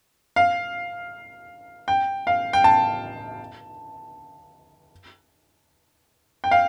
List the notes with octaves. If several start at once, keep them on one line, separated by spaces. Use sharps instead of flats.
F5
G5
F5
G5
A5
G5
F5